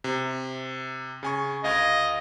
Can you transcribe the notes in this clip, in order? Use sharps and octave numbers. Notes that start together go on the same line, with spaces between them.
C3
C#3 G#5 C#6
D2 D#5 F5 G#6